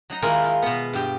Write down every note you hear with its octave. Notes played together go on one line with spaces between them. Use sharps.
F#3 D#4 A#5
D#3 G#3 E4 F4 G#4 A#4
F4
B2 B3
G2 G4